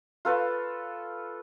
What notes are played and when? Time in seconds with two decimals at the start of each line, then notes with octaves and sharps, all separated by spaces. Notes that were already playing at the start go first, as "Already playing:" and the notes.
0.25 F4 A4 B4 C#5